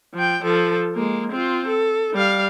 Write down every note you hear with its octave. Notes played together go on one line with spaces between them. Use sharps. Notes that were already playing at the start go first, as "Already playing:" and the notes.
F3 G5
F3 A4
G#3 A#3
C4 F4
A4
G3 F5